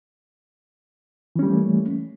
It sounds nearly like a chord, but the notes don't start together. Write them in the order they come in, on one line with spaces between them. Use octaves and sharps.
E3 C#4 G3 A3 A#3